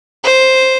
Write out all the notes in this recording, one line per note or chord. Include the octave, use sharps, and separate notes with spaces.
C5